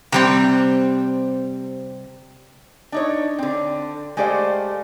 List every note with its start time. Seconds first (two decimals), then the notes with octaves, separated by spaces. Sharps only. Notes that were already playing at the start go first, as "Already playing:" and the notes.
0.12 C3 G3 C4
2.92 D4 D#4 C#5
3.39 D3 C4
4.17 G#3 A3 G4 C5 D5 F5